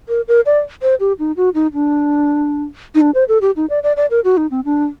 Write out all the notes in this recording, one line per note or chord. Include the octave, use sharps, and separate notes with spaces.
A#4
A#4
D5
C5
G4
D#4
F#4
D#4
D4
D#4
D4
C5
A4
G4
D#4
D5
D5
D5
A#4
F#4
D#4
C4
D4